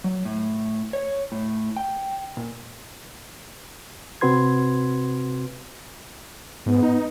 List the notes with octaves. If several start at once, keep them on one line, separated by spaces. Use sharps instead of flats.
F#3
A2
C#5
A2
G5
A#2
C3 C4 F#4 B4 C6 G#6
G#2 B3
D#4